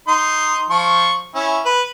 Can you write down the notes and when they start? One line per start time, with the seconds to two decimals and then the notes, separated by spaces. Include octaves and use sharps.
0.08 D#4 C6
0.70 F3 C#6
1.35 C#4 E4
1.65 B4